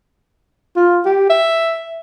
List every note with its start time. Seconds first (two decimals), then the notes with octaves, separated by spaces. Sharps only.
0.76 F4
1.05 G4
1.30 E5